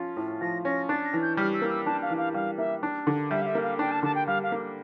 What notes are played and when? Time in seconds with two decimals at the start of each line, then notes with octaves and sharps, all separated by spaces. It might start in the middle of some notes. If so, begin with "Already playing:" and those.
Already playing: F3 C#4 F4
0.17 A2
0.41 F3 A#6
0.65 C#4 A#6
0.89 D4 A6
1.05 A#6
1.13 E3
1.22 G6
1.37 G3 F6
1.54 E6
1.62 A#3
1.70 E6
1.86 D4 A5
2.02 F5
2.10 E3
2.18 F5
2.34 G3 F5
2.58 A#3 E5
2.83 D4
3.07 D3
3.30 G3 E5
3.41 F5
3.47 E5
3.55 A#3
3.63 F5
3.79 D4 G5
3.91 A5
4.03 D3 A5
4.15 G5
4.27 G3 F5
4.43 F5
4.52 A#3